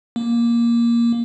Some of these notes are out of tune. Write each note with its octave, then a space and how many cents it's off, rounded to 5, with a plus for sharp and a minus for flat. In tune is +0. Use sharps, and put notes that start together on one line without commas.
A#3 +10